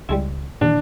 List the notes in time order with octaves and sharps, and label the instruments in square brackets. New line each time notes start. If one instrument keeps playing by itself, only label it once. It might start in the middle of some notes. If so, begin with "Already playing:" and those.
[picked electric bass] C#2 [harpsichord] G3 G#3 E4
[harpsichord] D#2 [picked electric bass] A#2 D#3 E3 [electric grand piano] D4